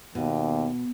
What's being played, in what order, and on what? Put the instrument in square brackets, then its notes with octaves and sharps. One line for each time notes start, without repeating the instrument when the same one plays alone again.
[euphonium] D#2 [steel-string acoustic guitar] B2